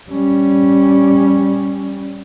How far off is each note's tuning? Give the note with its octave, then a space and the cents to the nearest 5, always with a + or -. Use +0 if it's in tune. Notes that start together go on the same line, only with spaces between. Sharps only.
G3 +0 C#4 +0